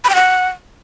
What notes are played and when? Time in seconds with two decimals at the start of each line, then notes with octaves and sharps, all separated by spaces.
0.04 B5
0.09 G5
0.15 F#5